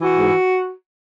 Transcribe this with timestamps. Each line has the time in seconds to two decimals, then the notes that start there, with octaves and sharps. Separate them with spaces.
0.01 E3 F#4
0.18 G#2